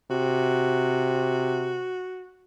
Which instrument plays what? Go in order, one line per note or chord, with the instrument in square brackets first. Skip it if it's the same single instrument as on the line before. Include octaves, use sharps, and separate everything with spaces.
[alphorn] C3 [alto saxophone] F#4